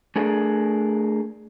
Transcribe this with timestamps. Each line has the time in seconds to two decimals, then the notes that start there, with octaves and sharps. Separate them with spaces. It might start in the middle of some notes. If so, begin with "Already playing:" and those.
0.16 A3 D4 G#4 A#4